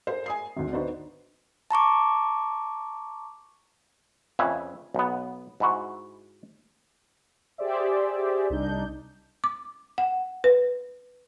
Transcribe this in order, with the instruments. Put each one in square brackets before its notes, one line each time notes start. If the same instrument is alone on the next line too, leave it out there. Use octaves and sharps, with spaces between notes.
[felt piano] G#4 A#4 C5
G#5 D#6 C7
G#1 D2 D3
B3 D4 D#4 F#4 B4 C5
[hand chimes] A5 A#5 C#6 D6
[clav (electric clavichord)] F2 C#3 B4 E5 G#5
B1 B3
G#2 E4 F#4
[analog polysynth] G4 G#4 C5 D5 E5
C2 D4 D#4 G6
[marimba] D6
F#5
B4